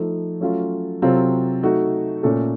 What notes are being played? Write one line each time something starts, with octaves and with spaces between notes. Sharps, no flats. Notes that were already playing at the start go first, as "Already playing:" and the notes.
Already playing: F3 A3 D#4 A4
F#3 A3 C#4 F4
C3 F#3 C4 F4 A4
A3 D#4 F#4
A#2 A3 C#4 A4